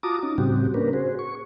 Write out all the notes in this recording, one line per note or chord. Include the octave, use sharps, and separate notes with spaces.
F4 F#4 A5 A#5 D6 D#6
C#4 D#4
A2 C#3 G3 C4 F#4 G4
A#3 C#4 D4 A#4 B4
F#4 G#4 C5
C#6